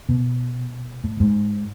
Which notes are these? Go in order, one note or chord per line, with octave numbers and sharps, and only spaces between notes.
B2
A2
G#2